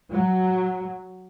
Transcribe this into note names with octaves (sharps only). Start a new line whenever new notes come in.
F#3